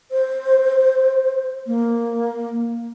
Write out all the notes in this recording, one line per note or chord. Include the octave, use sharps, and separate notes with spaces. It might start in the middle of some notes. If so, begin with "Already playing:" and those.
C5
A#3